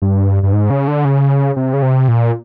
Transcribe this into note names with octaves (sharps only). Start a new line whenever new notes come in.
G2
G2
G#2
C#3
D3
C#3
C3
C#3
C3
A#2